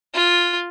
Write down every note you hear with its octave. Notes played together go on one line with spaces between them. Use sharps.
F4